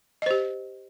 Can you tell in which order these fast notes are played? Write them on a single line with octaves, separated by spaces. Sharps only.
D#5 C5 G4